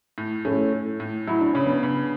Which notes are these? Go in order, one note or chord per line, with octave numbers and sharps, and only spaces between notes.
A2
A2 A3 C#4
A2
A2
F#3 E4
D4
C#3 C#4
B3 D4
C#3